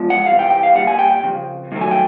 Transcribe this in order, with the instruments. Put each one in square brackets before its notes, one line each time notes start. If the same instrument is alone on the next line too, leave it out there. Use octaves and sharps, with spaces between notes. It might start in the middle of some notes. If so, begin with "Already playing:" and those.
Already playing: [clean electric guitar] E2 F3 G#3
F#5
C3 E3 G3 F5
G5
G5
F5
A#2 G3 F#5
G#5
G5
G5
F2 C#3
G2 D#3 F#3 A3
G#5
G5